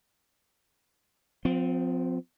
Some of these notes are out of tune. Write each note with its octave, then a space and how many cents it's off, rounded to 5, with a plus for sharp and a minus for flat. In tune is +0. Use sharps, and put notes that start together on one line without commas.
F3 +25 C4 -25